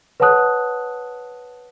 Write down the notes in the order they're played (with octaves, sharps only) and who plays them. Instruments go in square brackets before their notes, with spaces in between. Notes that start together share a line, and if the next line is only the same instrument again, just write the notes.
[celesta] B4 C#5 F#5 A5 D#6 F#6